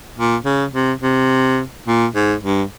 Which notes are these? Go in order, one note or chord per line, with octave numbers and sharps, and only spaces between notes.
A#2
C#3
C3
C3
A#2
G#2
G2